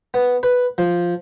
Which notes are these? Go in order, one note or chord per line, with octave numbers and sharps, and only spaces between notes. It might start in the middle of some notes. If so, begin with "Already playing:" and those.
B3
B4
F3